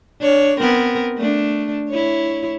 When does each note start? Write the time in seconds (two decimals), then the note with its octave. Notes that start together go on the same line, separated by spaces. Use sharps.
0.21 D4 C#5
0.60 B3 C4 A#4
1.18 A3 D4
1.89 E4 C#5